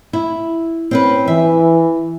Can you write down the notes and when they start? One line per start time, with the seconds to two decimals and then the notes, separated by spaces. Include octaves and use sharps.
0.13 E4
0.91 C4 C#4 B4
1.27 E3 E5